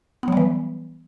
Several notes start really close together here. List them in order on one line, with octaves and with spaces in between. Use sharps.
B3 F#3 G3 E3